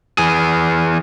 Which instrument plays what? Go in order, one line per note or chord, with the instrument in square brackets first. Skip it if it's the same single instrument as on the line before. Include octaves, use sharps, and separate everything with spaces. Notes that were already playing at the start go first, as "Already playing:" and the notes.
[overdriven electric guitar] E3 G#4